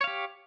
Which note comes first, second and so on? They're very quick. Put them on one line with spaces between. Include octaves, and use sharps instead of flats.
C#5 F5 G4